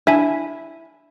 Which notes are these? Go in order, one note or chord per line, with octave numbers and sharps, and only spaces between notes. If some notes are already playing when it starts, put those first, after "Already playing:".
D4 E4 E5 G#5